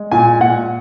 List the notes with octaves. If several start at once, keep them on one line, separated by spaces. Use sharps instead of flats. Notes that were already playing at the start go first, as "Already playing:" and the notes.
Already playing: G#3
A#2 G#5
A#2 F#5